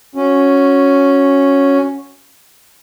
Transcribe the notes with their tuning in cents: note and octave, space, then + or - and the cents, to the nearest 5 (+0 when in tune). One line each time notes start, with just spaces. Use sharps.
C#4 +0 F#4 -15